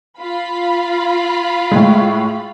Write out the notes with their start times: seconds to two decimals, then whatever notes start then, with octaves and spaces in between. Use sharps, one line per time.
0.19 F4 B5
1.71 A2 G#3